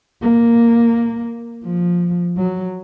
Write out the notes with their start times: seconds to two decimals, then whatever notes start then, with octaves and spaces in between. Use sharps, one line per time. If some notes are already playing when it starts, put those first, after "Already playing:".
0.22 A#3
1.65 F3
2.37 F#3